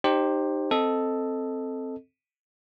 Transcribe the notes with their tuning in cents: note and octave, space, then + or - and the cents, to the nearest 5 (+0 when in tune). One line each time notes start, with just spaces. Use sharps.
D#4 -25 G4 +0 C5 +15
C4 +0 A4 +0 D#5 +0